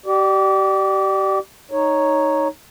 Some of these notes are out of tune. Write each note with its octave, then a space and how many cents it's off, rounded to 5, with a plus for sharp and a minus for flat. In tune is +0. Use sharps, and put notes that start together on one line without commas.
G4 -30 D5 +25
D#4 +0 C#5 +0